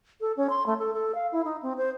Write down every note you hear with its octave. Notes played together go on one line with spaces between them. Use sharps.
A4
C#4
C6
A3
A4
A4
F5
E4
D#4
C4
C5